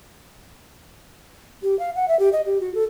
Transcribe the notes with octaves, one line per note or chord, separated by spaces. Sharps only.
G4
F5
F#5
E5
G4
D#5
G4
F#4
A4